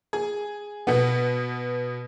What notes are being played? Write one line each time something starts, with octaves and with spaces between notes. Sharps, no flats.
G#4
B2 B3